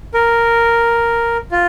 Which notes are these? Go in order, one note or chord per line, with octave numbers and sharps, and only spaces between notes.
A#4
F4